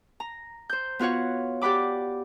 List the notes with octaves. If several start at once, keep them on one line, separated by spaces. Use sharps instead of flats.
A#5
C5 G6
B3 F4 F#4 C#5 F#5
G4 D5 F#5 B5 D6